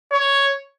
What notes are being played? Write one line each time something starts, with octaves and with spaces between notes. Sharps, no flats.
C#5